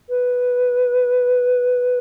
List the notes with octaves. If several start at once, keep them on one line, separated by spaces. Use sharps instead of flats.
B4